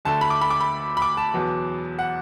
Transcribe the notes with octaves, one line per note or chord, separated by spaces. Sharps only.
D2 D3 A3 A5
B5
D6
B5
D6
B5
B5
D6
A5
E2 B2 F#3 B3
F#5